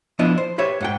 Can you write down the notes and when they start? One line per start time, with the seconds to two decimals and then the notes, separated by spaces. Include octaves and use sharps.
0.19 F3 B3 D4 E4 D#5
0.38 C5
0.58 G4 B4 C#5 E5
0.81 G#2 F#5 G5